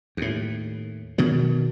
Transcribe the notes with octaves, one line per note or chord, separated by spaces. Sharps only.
D#2 A2
B2 D#3 F#3